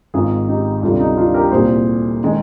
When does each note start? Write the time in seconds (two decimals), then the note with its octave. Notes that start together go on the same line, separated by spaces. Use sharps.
0.14 G#1 G#2 D#3 F4 G#4
0.49 D#4 G4
0.83 D2 C3 G3 D4 F4
1.00 D#4
1.17 D4 F4
1.34 G4 A#4
1.51 C2 A#2 G3 G#4 C5
2.24 D#3 G#3